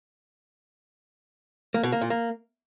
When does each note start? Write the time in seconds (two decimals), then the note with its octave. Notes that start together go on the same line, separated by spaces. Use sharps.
1.74 A#3
1.83 B2
1.92 A#3
2.01 A#2
2.10 A#3